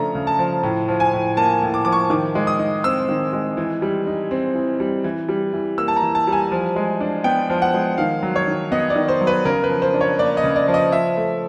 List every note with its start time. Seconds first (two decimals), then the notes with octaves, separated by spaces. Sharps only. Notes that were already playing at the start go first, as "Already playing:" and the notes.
Already playing: C#3 F3 A3 D4 A#5
0.15 C#3
0.27 A5
0.39 F3
0.63 A2
0.88 F3
1.00 G#5
1.13 A2
1.37 A#3 A5
1.62 A2
1.74 D6
1.85 F3 D6
1.92 C#6
2.10 D#3 D6
2.35 G#3
2.47 D#6
2.59 D#4
2.84 C4 E6
3.09 D#3
3.33 G#3
3.57 E3
3.82 G3
4.07 D#4
4.31 C4
4.55 E3
4.80 G3
5.04 E3
5.29 G3
5.53 E3
5.78 A#3 E6
5.88 A5
5.97 A#5
6.02 E3
6.15 A5
6.27 G3
6.32 G#5
6.52 F3
6.76 G#3
7.01 D4
7.24 B3 G5
7.50 F3
7.62 F#5
7.74 G#3
7.98 D#3 F5
8.23 F#3
8.36 C#5
8.48 D#3
8.72 B3 D#5
8.90 D5
8.96 D#3
9.08 C5
9.21 F#3
9.27 B4
9.45 C#3 A#4
9.64 B4
9.70 F3
9.82 C5
9.94 D4
10.01 C#5
10.19 A#3 D5
10.37 D#5
10.44 C#3
10.56 D5
10.68 F3
10.74 D#5
10.92 F3 E5
11.17 A3